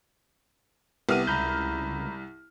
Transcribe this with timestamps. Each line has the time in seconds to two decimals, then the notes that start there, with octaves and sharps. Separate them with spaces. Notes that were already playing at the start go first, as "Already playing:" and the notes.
1.09 C2 B3 G4 F6 D#7
1.27 C#2 A#5 B5 G6